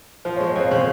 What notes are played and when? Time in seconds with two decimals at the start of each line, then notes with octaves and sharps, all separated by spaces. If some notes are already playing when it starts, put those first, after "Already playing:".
0.25 F3 C5
0.36 C#5
0.40 G#3
0.56 F2 C5
0.71 C#3 C#5